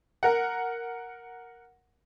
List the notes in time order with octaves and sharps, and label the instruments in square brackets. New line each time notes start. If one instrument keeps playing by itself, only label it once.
[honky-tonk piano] A#4 F#5